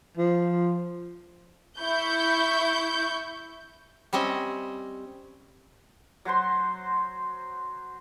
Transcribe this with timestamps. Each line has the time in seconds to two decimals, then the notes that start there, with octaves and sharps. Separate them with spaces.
0.17 F3
1.79 E4 C#6 G6
4.13 G3 C4 C#4 D#5 E5
6.25 F#3 F#4 C5 C6